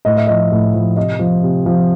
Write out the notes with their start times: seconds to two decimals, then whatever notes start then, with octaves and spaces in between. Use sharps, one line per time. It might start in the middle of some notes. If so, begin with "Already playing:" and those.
0.05 A2 D#5
0.16 E5
0.27 F3 D#5
0.52 A2
0.74 F3
0.96 C3 D#5
1.19 F3
1.43 C3
1.66 F3